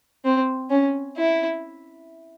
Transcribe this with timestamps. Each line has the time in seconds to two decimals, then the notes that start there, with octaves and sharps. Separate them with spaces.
0.25 C4
0.70 C#4
1.17 E4